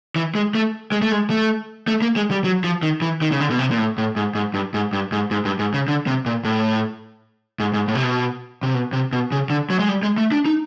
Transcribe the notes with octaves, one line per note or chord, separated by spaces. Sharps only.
E3
G#3
A3
G#3
A3
G#3
A3
A3
A#3
G#3
G3
F#3
F3
D#3
E3
D#3
C#3
D3
B2
C3
A#2
A2
A2
G#2
G#2
G2
G#2
G2
G#2
G#2
G2
G#2
C#3
D3
C3
A#2
A2
G#2
G#2
A2
C3
B2
C3
B2
C3
B2
C#3
D3
F#3
G#3
G3
G#3
A3
D4
D#4